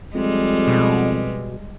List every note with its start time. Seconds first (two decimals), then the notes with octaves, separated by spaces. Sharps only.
0.15 F2 G3 G#3
0.68 B2